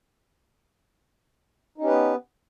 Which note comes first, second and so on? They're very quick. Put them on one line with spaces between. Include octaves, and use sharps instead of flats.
D#4 C#4 G4 B4 B3